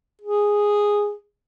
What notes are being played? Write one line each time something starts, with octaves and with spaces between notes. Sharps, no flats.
G#4